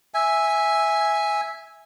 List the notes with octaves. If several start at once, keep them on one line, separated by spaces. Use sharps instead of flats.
E5 G#5